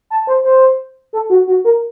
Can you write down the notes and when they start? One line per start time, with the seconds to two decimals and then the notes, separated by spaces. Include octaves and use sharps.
0.10 A5
0.27 C5
0.44 C5
1.13 A4
1.30 F#4
1.47 F#4
1.65 A#4